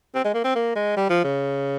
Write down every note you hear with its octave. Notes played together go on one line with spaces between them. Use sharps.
C4
G#3
A#3
C4
A#3
G#3
G3
F3
C#3